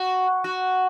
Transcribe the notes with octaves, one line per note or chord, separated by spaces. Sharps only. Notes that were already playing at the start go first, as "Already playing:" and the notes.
Already playing: F#4
F#4